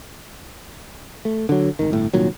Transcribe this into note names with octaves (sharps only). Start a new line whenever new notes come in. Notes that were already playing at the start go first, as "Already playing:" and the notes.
A3
D3 F#3
G#1 D#3
G1 A2
C2 A#2 D#3 F#3